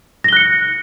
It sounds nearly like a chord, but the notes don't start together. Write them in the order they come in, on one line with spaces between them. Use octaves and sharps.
A#6 G7 F#6 C#7